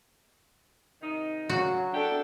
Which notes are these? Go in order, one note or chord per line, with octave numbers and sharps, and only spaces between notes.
C3 D#3 D#4
A#2 C#3 F#3 F#4
D4 E4 A4 G5